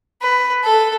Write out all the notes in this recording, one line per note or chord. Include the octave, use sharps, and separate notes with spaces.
B4
A4